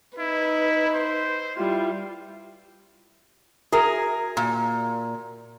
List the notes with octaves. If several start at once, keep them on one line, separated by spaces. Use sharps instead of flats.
D#4 E4 B4
C5
G3 E4 F4
F#4 G#4 A#4 E5 A#5
A#2